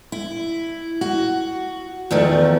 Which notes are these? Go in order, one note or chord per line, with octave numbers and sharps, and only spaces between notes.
E4
F#4
E2 D#3 F3 A3